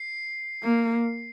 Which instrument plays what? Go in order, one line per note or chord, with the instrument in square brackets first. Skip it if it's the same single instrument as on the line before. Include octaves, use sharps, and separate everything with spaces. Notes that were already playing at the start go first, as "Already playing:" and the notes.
Already playing: [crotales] C7
[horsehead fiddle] A#3